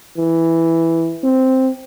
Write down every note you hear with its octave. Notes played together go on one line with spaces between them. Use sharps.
E3
C4